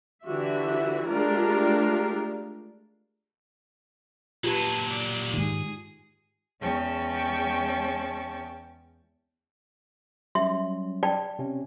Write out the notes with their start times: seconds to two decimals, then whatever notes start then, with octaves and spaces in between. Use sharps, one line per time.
0.24 D3 E3 F#4 G4 E5
1.08 G#3 A3 D4 F4 G4 A#4
4.44 A#2 F#3 F4 G4 B4 A5
4.87 D5
5.33 G#2 D#3 G#4
6.60 E2 G#3 C#4 G5 A5 C#6
10.35 F#3 G3 C#4 E5 C6
11.03 D5 G5 A5
11.39 C3 C#4